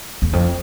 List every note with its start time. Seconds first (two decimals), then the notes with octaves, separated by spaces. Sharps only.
0.22 E2
0.33 F2